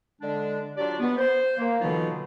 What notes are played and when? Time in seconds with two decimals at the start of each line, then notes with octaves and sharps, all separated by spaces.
0.22 D3 G#3 D4
0.77 F#3 D4 F4 G4 D5
1.00 B3
1.17 C5
1.58 A#3
1.81 B2 D3 E3 F#3 D#4 F4